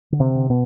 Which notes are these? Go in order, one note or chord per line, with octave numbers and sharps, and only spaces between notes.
D3
C3 C4
D3
B2 B3